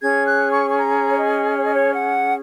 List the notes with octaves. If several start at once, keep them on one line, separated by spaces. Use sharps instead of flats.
C#4 G#4 C#5 G#6
F#6
C#6
C#6
A#5
C#5
D#5
C#5
D#5
C#5
F#5